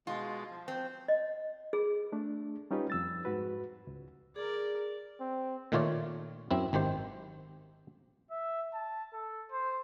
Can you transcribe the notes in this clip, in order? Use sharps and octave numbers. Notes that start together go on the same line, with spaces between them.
B2 G#3 F4
F3
C4
D#5
G#4
A3 D4
G3 C#4 D#4 F4 G4 B4
F2 E6 A6
G#2 F#4 B4
C#2
G#4 A#4 D5
C4
A#2 D#3 A3 F4 C#5 D5
F#2 C4 E4
G#1 D#3 G4 C5
E5
A5
A4
C5